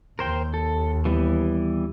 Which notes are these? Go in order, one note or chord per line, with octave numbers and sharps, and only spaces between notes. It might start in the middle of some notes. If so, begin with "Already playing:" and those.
D#2 A#4 C5 G5
A4
E3 G3 B3